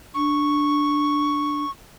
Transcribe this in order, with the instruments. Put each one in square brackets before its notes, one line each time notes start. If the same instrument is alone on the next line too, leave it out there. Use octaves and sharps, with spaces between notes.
[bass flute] D4 [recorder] C#6